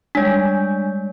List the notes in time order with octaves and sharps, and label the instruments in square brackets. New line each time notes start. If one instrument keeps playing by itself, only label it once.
[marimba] G3 G#3 [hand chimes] D4 C#5